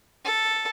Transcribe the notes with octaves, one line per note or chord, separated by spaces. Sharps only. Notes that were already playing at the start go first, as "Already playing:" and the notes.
A4